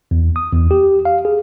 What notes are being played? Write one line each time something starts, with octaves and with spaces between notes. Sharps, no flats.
E2
D#6
E2
G4
F5
G#4